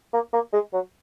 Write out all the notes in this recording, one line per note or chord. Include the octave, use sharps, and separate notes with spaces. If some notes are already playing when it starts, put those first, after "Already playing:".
A#3
A#3
G#3
F#3